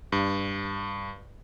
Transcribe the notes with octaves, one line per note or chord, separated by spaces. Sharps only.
G2